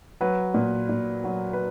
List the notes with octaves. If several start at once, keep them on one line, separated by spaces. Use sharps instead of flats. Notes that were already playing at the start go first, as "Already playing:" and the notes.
F#3 B4
A#2
A#2
F#3
B4